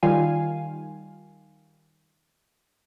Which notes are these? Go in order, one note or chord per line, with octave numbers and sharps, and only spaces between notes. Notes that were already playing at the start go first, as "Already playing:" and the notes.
D#3 G3 F4 F5 G#5